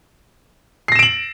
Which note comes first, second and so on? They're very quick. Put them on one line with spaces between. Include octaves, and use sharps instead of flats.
C7 A#6 E7 D7 F#7